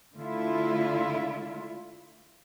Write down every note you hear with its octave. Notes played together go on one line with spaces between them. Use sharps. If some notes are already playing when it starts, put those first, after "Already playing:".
D3 A3 E4 F4